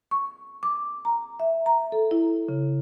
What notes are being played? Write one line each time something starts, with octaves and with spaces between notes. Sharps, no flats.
C#6
D6
A#5
E5
A#5
A4
E4
C#3